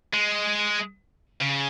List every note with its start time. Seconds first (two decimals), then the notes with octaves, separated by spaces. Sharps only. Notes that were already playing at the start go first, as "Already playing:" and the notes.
0.13 G#3
1.41 C#3